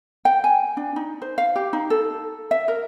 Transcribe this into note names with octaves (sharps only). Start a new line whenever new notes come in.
G5
G#5
D4
D#4
C5
F5
G4
D#4
A4
E5
A#4